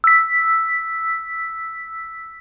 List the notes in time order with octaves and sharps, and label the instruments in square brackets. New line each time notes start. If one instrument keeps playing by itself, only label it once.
[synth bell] E6 B6